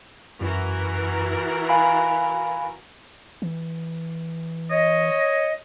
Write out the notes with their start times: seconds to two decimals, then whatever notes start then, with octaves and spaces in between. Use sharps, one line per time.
0.41 F#2 E3 F#4 A#4
1.69 F5 G#5 B5
3.42 E3
4.71 C#5 D#5